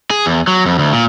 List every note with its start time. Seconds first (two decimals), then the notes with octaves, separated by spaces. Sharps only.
0.10 G#4
0.26 E2
0.48 F#3
0.66 F2
0.78 D2
0.93 A#2